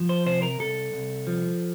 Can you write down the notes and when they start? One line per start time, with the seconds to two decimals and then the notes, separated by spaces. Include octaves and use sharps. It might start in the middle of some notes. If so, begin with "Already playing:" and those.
Already playing: F3
0.09 C5
0.26 C3 C5
0.42 A#4
0.59 C2 A4
0.92 C2
1.27 F3